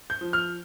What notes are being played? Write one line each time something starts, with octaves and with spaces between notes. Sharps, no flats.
G6
F3
F6